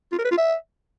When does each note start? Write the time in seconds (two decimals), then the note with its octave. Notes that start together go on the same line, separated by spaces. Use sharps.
0.12 F4
0.18 A#4
0.25 B4
0.31 F4
0.37 E5